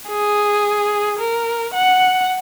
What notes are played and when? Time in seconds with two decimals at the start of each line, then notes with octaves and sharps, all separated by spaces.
0.10 G#4
1.19 A#4
1.74 F#5